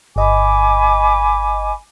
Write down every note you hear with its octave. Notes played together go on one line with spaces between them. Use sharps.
G1 D#5 G#5 B5 D6